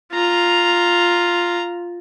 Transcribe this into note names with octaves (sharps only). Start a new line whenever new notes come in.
F4 A#5